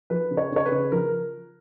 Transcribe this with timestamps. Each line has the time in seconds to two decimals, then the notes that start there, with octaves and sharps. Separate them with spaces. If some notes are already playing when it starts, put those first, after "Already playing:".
0.10 F3 B4
0.31 C#3
0.37 C#5
0.52 C#3 C#5
0.65 B4
0.71 C#3
0.92 F3 A#4